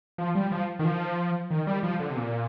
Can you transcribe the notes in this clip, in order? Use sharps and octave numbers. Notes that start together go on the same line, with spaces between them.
F3
G3
F3
D#3
F3
D#3
G3
F3
D3
C3
A#2